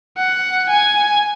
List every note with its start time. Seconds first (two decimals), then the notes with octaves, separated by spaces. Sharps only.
0.18 F#5
0.70 G#5